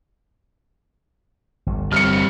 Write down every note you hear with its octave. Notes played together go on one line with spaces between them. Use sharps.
G1
G2 G3 C4 F6 C#7